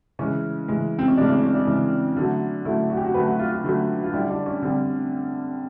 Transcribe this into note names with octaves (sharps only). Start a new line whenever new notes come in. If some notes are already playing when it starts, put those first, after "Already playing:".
C#3 E3 G#3 C#4
C#3 E3 G#3
C4
C#4
C#3 E3 G#3 D4
C#4
C#4
D4
C#3 E3 G#3
D3 F#3 A3
D3 F#3 A3 E4
F#4
G4
F#4
D3 F#3 A3 B4
F#4
F4
F4
D3 F#3 A3
F4
D3 G3 E4
D4
C#4
D3 G3 C4